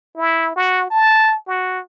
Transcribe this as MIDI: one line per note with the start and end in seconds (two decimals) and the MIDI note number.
0.16 0.52 64
0.56 0.86 66
0.90 1.37 81
1.47 1.80 66